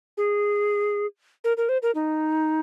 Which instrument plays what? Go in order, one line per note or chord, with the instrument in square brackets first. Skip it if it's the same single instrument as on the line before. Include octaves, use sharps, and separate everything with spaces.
[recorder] G#4
A#4
A#4
C5
A#4
D#4